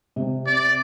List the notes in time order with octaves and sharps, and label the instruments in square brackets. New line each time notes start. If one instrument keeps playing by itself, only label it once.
[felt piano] C3
[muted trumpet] D5